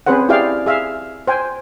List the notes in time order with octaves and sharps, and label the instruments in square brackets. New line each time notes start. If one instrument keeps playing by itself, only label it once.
[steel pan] C4 C#4 G#4 B4 C5 F#5
E4 G4 G#4 D5 F5 G5
G#4 E5 F5
C5 G5 G#5